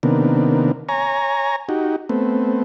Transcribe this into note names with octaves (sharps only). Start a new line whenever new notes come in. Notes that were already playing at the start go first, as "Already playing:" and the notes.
C3 D#3 A#3 B3 D4
C#5 G#5 A#5
D#4 F#4 G4
A3 B3 C4